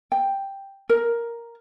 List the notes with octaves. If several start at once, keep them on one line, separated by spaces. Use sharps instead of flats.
G5
A#4